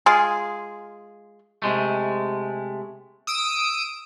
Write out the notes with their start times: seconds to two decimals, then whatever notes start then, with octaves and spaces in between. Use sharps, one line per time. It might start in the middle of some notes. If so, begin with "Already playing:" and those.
0.06 G#3 F4 G#4
1.62 C3 G#3 A3
3.27 D#6 E6 D7